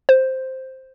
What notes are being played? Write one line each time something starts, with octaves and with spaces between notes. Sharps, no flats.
C5